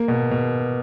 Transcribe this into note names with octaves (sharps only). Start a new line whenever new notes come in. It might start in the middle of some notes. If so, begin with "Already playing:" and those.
Already playing: A#3
B2
B2